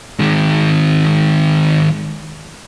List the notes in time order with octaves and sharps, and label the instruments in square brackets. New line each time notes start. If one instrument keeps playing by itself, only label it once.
[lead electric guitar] D#3 G#3